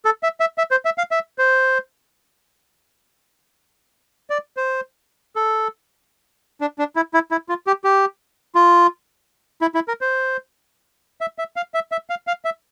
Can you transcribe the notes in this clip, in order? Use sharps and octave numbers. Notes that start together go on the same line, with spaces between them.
A4
E5
E5
E5
C5
E5
F5
E5
C5
D5
C5
A4
D4
D4
E4
E4
E4
F4
G4
G4
F4
E4
E4
A#4
C5
E5
E5
F5
E5
E5
F5
F5
E5